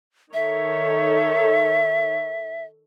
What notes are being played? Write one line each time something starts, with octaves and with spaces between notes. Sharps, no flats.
D#3 A4 C#5 E5